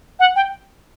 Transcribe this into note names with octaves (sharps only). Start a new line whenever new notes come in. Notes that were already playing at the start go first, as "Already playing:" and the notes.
F#5
G5